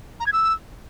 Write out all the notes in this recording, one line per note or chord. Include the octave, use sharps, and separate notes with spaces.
A#5
G#6
E6